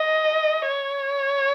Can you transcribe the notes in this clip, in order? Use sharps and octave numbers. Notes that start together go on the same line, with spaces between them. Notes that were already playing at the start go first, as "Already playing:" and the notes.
Already playing: D#5
C#5